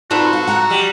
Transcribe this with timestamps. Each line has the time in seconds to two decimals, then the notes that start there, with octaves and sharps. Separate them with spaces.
0.11 C4 D#4 F4 F#4 A4 B4 D5
0.33 F5
0.47 F#5 A#5
0.70 G3